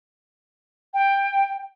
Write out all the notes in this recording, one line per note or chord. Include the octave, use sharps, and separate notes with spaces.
G5